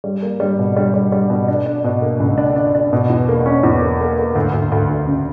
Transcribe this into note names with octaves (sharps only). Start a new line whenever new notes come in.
G3
A#3
G3
B2
G3
G3
G3
B2
D4
D4
B2
A#3
C#2
D4
D4
D4
B2
E2
A#3
C#4
E2
A#3
A#3
A#3
D2
D2
D2
D2
C#3